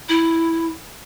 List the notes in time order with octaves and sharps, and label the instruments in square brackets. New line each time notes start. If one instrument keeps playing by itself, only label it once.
[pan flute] E4